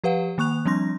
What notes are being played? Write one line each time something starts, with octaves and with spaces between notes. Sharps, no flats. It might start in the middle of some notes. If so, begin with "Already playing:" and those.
F3 G4 B4 F5 F#5
D#3 A#3 C#6 F#6 F7
F3 G3 C4 D4 C6 A#6